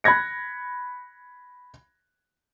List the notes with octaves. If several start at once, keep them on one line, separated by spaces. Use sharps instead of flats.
B5 F#6 G#6 A#6 C#7